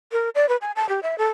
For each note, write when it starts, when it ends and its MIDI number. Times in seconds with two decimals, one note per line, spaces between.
0.12 0.30 70
0.35 0.48 74
0.49 0.57 71
0.61 0.72 80
0.76 0.87 81
0.89 1.00 67
1.03 1.18 76
1.18 1.27 69